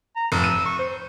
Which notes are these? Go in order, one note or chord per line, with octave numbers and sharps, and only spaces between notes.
A#5
F1 E6
D#7
C#6
C5